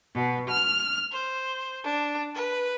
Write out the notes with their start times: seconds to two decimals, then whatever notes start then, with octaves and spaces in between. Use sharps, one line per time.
0.14 B2
0.50 F6
1.12 C5
1.84 D4
2.35 B4